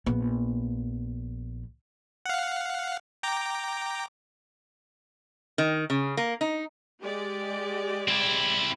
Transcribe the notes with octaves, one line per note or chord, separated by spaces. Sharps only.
A#1 B3
F5 F#5
G5 A#5 D6
D#3
C#3
A#3
D#4
G#3 G4 D5
C4 E4